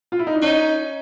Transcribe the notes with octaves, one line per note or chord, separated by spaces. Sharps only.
F4
E4
D#4
D4
C#4 D#4